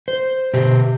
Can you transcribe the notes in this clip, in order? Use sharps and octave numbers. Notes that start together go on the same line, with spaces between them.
C5
B2 G4